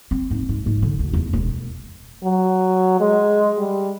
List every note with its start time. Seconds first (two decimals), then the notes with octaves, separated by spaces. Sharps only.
0.11 C4
0.31 G#2
0.49 G#2
0.66 G#2
0.83 D3
0.99 D2
1.13 E2
1.33 E1
2.24 F#3
3.00 G#3
3.58 G3